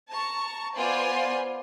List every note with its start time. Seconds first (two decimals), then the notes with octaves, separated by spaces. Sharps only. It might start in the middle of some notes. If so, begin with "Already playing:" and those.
0.11 A5 A#5 C#6
0.76 B3 F4 C5 D5 G#5 C6